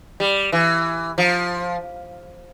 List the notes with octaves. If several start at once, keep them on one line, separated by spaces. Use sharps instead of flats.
G3
E3
F3